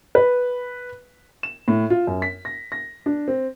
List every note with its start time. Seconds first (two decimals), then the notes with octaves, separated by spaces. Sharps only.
0.15 B4
1.43 E7
1.68 A2
1.90 F4
2.07 F#2
2.22 B6
2.45 A#6
2.72 A#6
3.06 D4
3.28 C4